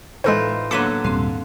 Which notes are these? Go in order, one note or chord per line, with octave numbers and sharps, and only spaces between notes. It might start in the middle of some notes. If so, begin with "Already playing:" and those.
A2 E3 G#3 D#4 F4 A4 C5 G6
D3 F#3 A#3 B3 A4 D6 B6 D#7
D#1 G#2 G3 C4 F5 C6